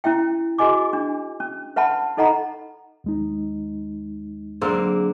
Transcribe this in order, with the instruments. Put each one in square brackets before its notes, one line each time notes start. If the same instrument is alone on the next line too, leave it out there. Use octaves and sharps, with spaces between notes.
[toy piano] C#4 E4 E5 G5
F#4 G#4 D#5 G#5 D6
D4
C#4
B4 E5 F#5 A5 B5
D#4 A4 D#5 F#5 A#5 B5
[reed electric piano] D#2 G#3 D#4
[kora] D3 A#3 C4 [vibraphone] F#3 G#4